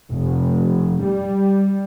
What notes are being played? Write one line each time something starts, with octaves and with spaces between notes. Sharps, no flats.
F1
G3